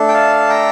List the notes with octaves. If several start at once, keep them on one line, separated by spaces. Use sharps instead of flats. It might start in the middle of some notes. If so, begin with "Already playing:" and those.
Already playing: A3 D4 A4
G5
F5 A5
G5 A#5